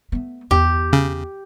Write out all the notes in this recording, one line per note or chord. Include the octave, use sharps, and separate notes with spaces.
A3 B3
E2 G4
C#3